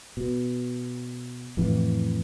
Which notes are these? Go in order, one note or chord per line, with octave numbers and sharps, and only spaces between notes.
B2
F2 A2 E3